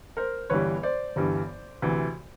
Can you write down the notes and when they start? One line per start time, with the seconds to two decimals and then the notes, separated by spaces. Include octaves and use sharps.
0.17 A#4 C5
0.50 G1 G2 E3 G3 B4 C#5
0.83 C5 D5
1.16 G1 G2 E3 G3
1.82 D2 C3 E3